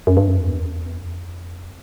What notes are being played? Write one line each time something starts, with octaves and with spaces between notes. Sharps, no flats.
F#2
G2
F#2
F2
E2
F2